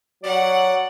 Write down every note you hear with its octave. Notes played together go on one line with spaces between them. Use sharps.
F#3 D5 F#5